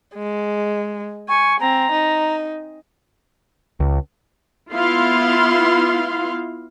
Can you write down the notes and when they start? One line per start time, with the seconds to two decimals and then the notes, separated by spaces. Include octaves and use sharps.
0.16 G#3
1.28 G#5 C#6
1.60 C4 A#5
1.92 D#4
3.80 C#2
4.72 B3 E4 F4 F5 C6